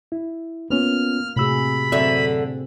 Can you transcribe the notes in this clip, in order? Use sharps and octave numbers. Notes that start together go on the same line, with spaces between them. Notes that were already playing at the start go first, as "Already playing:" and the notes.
E4
A#3 B3 C#4 F4 F6
A2 C3 F#4 G#4 B5 E6
F#2 D3 C4 E5